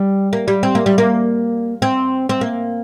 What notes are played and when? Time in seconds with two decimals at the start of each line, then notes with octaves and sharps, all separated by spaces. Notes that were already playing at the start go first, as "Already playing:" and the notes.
Already playing: G3
0.33 A#3
0.48 G3
0.63 C4
0.75 A#3
0.86 G3
0.98 A#3
1.82 C4
2.29 C4
2.41 A#3